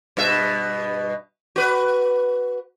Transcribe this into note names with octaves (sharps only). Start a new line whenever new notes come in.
G2 B2 E5
F#4 B4